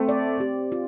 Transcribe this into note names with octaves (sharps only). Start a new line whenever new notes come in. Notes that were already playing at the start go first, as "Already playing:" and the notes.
Already playing: A3 C4
D5
G4
F4